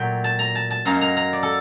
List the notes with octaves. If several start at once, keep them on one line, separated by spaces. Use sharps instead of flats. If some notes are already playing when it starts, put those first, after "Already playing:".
Already playing: A#2 F#3 A3 G5
A5
A#5
A5
A5
F#2 F#3 A#3 D#4 A#5
A#5
A#5
D5
A4